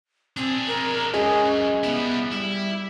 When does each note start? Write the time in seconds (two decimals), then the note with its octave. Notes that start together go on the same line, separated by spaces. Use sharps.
0.37 C4 D4 G#4
0.67 A#4
1.14 F#2 G#3 C#4 G#4
1.84 G3 B3 E4
2.32 G3 E4